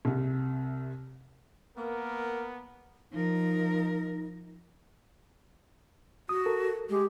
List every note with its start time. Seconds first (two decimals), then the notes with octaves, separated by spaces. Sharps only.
0.05 C2 C3
1.77 A#3 B3 A#4
3.12 F3 D#4 A#4
6.29 F#4 D#6
6.46 A4 A#4
6.89 G#3 G4